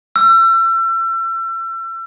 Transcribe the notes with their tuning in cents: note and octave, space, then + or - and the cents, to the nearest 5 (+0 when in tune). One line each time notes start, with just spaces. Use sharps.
E6 +35